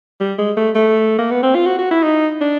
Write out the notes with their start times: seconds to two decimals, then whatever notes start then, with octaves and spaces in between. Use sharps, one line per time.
0.21 G3
0.39 G#3
0.57 A3
0.75 A3
1.18 A#3
1.31 B3
1.43 C4
1.55 F4
1.66 F#4
1.79 F#4
1.91 E4
2.03 D#4
2.41 D4